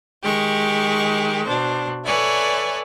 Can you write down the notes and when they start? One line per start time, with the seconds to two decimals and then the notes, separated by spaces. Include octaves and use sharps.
0.23 D#3 G#3 G4 C#6
1.47 B2 D4 C5
2.05 A4 B4 C#5 D5 E5 G#5